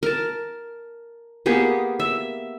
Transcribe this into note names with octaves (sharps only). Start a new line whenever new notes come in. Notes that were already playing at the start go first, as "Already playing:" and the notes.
A#4 A5
A#3 B3 G4 G#4
E5